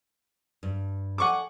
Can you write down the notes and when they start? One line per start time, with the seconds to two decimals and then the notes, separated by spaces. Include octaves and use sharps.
0.63 G2
1.18 A4 D5 F#5 G#5 C#6 D6